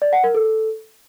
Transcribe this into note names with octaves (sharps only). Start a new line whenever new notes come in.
D5
F#5
A#4
A4